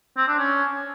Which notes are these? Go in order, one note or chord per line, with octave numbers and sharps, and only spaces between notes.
C4
D4
C#4